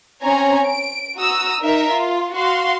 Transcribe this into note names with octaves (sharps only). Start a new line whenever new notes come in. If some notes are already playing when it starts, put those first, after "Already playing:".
C4 C#4 G#5 A#5
D7
F#4 A#5 D#6 E6
D#4 A#4 E5
F4
F#4 F5 C6